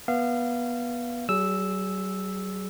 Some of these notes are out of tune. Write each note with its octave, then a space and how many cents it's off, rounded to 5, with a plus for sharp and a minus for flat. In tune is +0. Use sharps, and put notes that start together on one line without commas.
B3 -20 F5 -25
F#3 +45 G#4 +5 E6 -5